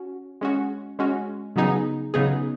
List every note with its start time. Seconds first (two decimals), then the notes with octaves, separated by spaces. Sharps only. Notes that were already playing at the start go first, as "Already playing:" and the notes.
Already playing: C#4 F#4
0.41 G#3 C#4 F#4
0.99 G#3 C#4 F#4
1.56 C#3 F#3 B3 D#4 G#4
2.14 C#3 F#3 B3 D#4 G#4